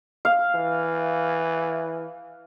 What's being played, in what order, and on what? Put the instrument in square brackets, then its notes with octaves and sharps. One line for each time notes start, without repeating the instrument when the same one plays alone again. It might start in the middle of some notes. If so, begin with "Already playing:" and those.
[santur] F5
[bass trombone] E3